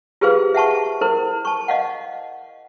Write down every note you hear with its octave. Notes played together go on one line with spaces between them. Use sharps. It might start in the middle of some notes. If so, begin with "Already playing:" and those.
F4 G4 G#4 B4 C5 F5
E5 F#5 A5 C#6
E4 A#4 C5
A5 C#6
D#5 F5 F#5